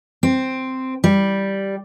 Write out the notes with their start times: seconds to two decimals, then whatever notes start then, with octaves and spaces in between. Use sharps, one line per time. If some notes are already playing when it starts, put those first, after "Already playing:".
0.23 C4
1.04 G3